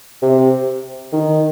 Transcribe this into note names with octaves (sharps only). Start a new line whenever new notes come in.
C3
D#3